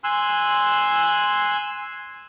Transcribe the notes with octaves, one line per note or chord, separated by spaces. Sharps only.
G#5 C6 E6 F#6